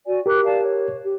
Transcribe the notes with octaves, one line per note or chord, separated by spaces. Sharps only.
F#4 D5 G#5
G4 A#4 D6 F#6
D5 F5 A5
C#5
G4